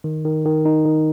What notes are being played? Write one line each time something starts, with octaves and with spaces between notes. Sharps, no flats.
D#3
D#3
D#3
D#4
D#3